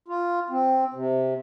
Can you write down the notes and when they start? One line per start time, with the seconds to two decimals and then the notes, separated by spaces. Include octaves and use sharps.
0.08 F4
0.50 C4
0.94 C3